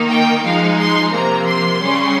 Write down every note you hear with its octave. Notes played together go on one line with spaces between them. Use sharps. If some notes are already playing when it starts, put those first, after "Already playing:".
Already playing: D#3 A#3 D#4
G5
F3 G#3 D#4 F5
C6
C3 F3 A#3 A#5
C6
C#3 G3 C#4